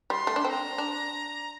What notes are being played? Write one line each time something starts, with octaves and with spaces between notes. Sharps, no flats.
G3 C6
A3
D4
C4 A#5 C6
D4